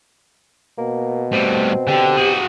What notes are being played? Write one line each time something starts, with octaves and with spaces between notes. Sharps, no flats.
B2 A#3
A2 G3 C4
D3 G4
B2 F#4 G#4